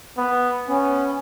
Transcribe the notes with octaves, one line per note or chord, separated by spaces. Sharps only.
B3
B3 C#4